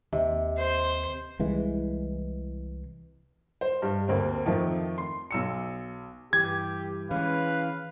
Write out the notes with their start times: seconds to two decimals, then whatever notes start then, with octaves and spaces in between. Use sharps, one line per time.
0.13 D#2 C3 D#5
0.58 C5
1.39 C2 E3 G#3
3.61 C5
3.82 G2
4.08 D2 A#3 C4
4.46 F2 D#3 F3 A3
4.98 C6
5.31 B1 E6 C#7
6.33 G2 E3 G4 G#6
7.11 E3 G#3 C#4 B4 F5